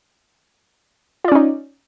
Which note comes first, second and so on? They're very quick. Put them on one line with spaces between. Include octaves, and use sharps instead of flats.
F4 D5 C#4 D#4